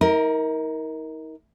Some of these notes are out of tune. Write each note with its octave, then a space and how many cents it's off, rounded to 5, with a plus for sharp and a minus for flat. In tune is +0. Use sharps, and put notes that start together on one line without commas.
D#4 +40 A#4 +5